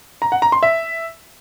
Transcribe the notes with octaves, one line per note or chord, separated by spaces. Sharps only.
A#5
F#5
A#5
C6
E5